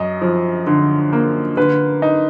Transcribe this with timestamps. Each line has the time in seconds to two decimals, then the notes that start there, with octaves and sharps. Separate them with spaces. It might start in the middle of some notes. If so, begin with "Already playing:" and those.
Already playing: F#2 D#5
0.22 F3
0.67 D3
1.13 A#3
1.57 D3 B4
2.02 D#4